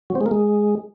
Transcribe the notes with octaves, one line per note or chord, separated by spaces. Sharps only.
F#3
C4
G#3
A#3
G#3